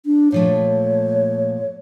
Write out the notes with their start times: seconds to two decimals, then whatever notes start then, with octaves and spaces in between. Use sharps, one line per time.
0.06 D4
0.32 A#2 F3 A3 C#5